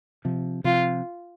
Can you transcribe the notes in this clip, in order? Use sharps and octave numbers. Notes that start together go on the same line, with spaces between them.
C3 F3
C3 F3 F4